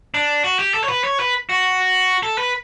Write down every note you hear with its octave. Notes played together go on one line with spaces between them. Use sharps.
D4
F#4
G4
A4
C#5
B4
C#5
B4
F#4
A4
B4